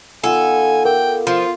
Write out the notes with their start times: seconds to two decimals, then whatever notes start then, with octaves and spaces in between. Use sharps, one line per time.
0.24 D#3 B3 F4 A4 G#5
0.85 A#4 G5 D6
1.27 F3 F4